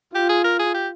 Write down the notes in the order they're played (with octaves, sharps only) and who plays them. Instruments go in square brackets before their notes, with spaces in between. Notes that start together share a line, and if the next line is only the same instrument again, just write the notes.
[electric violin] F4 [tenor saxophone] G4
[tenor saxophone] G#4
A#4
G#4
G4